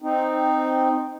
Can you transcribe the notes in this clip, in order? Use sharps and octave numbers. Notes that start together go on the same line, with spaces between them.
C4 D#4